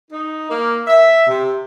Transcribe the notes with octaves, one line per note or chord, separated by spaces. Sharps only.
D#4
A#3
E5
C3